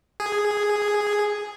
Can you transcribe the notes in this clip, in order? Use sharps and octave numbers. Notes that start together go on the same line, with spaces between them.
G#4